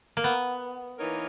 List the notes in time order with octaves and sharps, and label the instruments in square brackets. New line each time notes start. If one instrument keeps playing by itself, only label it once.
[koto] A#3
B3
[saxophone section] E3 A#3 D#4 A#4 C#5